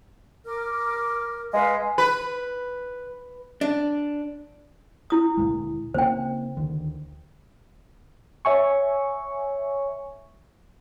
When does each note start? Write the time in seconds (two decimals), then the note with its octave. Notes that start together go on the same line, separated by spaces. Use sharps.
0.46 A#4 D6 F6
1.54 G#3 B4 F5
1.98 B4
3.61 D4
5.10 E4 D#6
5.37 D2 A#2 G#3
5.94 C#3 A#3 C4 C5 G5
6.57 D2 D#3
8.45 C#5 E5 G#5 C#6